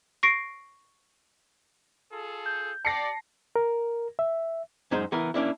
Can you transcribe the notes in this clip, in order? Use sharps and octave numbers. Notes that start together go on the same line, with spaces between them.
C#6 A#6 C7 D7
F4 G#4 A4
G6
G4 D5 A5 A#6 C7 C#7
A#4
E5
F#2 G#3 D#4 G#4 C5
E3 B3 A#4
A#3 C#4 D4 E4